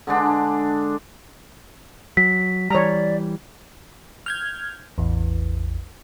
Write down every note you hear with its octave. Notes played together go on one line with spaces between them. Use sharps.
D3 G#3 D4
F#3 B6
E3 G3 C#5 D5 A#5
F6 G6 G#6
A1 E2